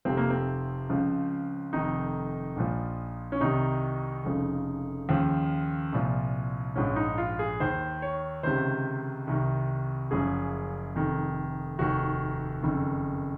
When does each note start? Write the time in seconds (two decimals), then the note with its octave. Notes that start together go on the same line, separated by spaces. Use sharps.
0.05 F1 F2 C3 F3 C4
0.17 A#3
0.30 C4
0.89 C#2 C#3 F3
1.73 F1 F2 D#3 D#4
2.56 A#1 A#2 F3
3.32 C#4
3.40 C2 C3 D#3 D#4
4.24 F1 F2 C#3 F3
5.09 D#2 C#3 F3
5.92 C2 A#2 F3
6.76 A#1 G#2 F3 C#4
6.96 D#4
7.18 F4
7.39 G#4
7.60 D#2 D#3 C5
8.02 C#5
8.43 C#2 C3 D#3 C5
9.27 C2 C3 D#3
10.11 F#1 F#2 C#3 F3 G#4
10.96 F1 F2 D#3
11.78 F1 D#2 D#3 F#4
12.62 F#1 F2 D#3